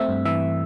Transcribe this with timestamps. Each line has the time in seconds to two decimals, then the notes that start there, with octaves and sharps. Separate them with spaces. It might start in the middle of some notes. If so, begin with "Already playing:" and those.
Already playing: A3 C4 E5
0.09 G2
0.25 E3 E5